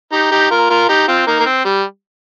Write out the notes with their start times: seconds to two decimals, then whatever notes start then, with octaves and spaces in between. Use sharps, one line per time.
0.12 D#4 G4
0.32 D#4 G4
0.50 F4 A#4
0.70 F4 A#4
0.89 D#4 G4
1.08 C4 F4
1.27 A#3 D#4
1.40 A#3
1.46 C4
1.65 G3